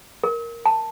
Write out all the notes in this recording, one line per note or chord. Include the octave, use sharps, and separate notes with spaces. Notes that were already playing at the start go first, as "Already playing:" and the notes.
A#4
A5